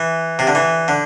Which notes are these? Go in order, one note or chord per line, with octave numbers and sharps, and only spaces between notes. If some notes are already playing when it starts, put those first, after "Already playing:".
Already playing: E3
C3
D3
E3
D3